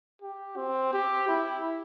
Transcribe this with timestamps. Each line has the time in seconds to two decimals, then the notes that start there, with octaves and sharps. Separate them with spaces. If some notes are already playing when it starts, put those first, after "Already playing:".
0.22 G4
0.57 C4
0.93 G4
1.28 E4